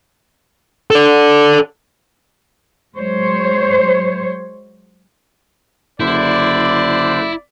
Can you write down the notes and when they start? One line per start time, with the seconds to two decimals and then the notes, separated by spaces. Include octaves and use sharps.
0.91 A4 D5
2.97 F#3 G#3 C5 C#5
6.00 F#1 D3 E4 C5 D5